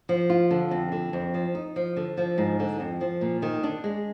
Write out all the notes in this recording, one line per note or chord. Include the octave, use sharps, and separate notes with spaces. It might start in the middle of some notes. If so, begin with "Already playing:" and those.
F3
F4
D3
F2
D3
F2
F3
D#4
F3
D3
F3
G#2
D3
F2
F3
A#2
D#3
D4
G#3